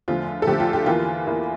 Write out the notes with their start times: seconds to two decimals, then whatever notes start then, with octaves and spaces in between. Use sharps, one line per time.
0.08 E2 D3 F3 A3 F4
0.42 A4
0.47 E2 D3 F3 A3 G4
0.60 F4
0.73 G4
0.86 E2 E3 A#3 F4
1.26 E2 E3 A#3